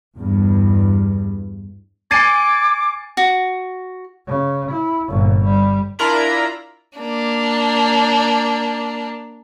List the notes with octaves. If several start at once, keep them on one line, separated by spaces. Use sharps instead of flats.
E2 G2
G#5 D6 G#6 A6 C7 D#7
F#4
C#3
E4
G1 A#2
G3
D4 E4 F4 A#4 A#5 B5
A#3 D4